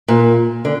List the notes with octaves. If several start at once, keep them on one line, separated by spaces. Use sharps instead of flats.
A#2
D3